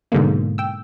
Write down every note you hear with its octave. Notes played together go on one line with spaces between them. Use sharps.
G#2 B2 D3 F#3 G#3 A#3
G5 E6